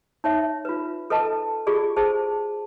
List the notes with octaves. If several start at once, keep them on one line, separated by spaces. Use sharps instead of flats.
D#4 C#5 E5
F4 B4
A4 B4 D#5 A5
F4 G4 G#4 D5
G#4 C5 A5